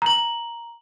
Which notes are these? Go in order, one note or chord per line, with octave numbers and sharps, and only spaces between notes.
A#5 F#7